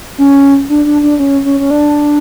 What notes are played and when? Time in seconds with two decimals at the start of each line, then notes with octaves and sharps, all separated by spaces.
0.18 C#4
0.70 D4
0.86 D4
1.03 D4
1.19 C#4
1.45 C#4
1.60 C#4
1.71 D4